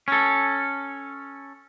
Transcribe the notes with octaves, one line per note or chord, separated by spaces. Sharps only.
C#4 A4